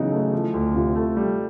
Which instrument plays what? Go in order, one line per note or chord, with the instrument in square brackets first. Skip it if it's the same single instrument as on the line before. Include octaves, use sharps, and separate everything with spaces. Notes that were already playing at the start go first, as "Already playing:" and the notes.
Already playing: [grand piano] C#3 [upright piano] E3 F#3 B3 D#4
[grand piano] A3
F3
D2
[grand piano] C3 [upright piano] F4
[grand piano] A3
G3